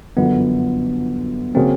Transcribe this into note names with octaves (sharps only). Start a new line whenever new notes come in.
G1 F#2 D3 F3 B3
C#3 F#3 A#3 C4